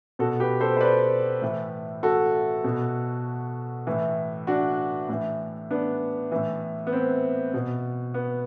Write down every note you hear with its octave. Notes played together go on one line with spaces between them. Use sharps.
B2 F#4 A4
G4 B4
A4 C5
C5
B4 D5
A2 E3
F#4 A4
B2
A2 E3
D4 F#4
A2 E3
B3 D4
A2 E3
B3
C4
B2
B3